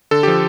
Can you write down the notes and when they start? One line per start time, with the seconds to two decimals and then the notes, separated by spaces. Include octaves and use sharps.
0.11 D3 A4
0.23 F3 G4